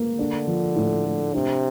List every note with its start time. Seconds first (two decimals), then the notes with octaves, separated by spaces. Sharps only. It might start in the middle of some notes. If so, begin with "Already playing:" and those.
Already playing: A#3
0.18 D3 D4
0.47 F3
0.76 A2
1.05 A3
1.33 C3 D4